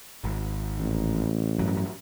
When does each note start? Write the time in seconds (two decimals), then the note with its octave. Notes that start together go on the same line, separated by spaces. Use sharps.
0.24 G#1
0.78 A1
1.59 G2 F#3